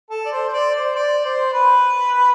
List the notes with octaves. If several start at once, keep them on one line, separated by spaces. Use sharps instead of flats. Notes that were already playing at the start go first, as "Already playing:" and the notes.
A4
D5
C5
C5
D5
C5
D5
C5
B4